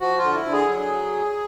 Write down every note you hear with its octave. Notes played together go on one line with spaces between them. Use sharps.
F3 F#4
F4
D3
E4
D3
G#4
F#3